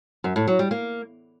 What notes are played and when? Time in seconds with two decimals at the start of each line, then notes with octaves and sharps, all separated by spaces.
0.24 F#2
0.36 A2
0.48 F#3
0.59 G3
0.71 A#3